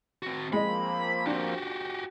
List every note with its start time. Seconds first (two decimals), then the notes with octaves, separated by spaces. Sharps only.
0.23 C4 F#4
0.53 F3 G#3 A#3 C4 D#5 B5
1.26 D4 F#4 G4